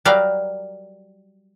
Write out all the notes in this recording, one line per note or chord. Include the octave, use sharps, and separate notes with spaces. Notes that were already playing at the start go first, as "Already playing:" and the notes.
F#3 G3 G4 A#4 D5 F5